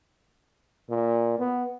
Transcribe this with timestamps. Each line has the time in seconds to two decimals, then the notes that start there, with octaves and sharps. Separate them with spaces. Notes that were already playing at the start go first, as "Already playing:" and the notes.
0.90 A#2
1.39 B3